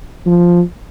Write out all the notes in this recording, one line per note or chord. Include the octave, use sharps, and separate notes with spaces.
F3